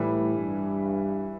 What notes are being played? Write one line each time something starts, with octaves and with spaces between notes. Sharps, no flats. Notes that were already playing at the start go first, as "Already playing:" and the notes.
Already playing: A2 E3 G3 E4 B4
G2